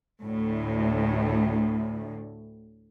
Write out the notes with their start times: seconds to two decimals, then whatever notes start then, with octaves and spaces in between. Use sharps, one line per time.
0.24 D2 A2